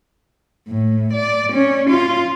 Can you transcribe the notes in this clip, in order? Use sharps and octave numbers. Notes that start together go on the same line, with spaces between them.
A2
D5
C#4
F4